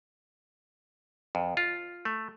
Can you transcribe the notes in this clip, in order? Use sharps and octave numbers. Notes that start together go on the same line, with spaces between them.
F2
F4
A3